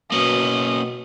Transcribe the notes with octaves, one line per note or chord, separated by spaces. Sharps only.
B2 A#3 C#4 D#6